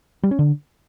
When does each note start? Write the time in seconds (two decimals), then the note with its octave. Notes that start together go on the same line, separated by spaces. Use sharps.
0.23 G3
0.31 C#4
0.39 D3